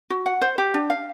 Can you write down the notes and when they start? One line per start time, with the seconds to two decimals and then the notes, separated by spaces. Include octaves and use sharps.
0.10 F#4
0.26 F#5
0.42 C5
0.58 G4
0.74 D4
0.90 F5